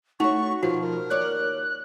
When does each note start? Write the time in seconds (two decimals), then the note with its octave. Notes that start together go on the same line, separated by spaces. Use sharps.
0.20 A3 D#4 F#4 C#5 C#6
0.63 B2 D#3 F3 F4 F#4
0.81 A#4
1.10 D#2 C#5 D5 F#6